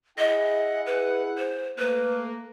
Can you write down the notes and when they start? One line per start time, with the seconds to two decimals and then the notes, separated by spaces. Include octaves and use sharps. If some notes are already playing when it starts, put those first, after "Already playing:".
0.18 E4 G#4 D#5 F#5
0.86 B4
1.38 C5
1.78 A3 A#3 B4